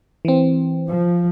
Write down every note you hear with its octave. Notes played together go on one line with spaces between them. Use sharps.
E3 C4
F3